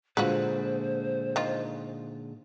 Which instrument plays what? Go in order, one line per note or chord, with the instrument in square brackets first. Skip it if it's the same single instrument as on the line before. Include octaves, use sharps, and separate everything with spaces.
[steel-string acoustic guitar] A#2 D3 G#3 [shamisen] F4 F#4 B4 [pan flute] C5
[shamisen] D#3 F4